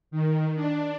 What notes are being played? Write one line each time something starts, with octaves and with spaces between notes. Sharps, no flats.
D#3
D4